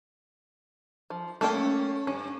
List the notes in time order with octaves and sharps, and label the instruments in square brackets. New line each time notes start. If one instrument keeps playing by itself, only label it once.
[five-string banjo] F3
[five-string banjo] A3 A#3 G5 [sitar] C#4
[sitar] G2 [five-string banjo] C#4